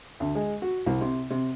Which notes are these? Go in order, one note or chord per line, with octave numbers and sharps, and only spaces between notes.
D2
G#3
F#4
C2
C3
C3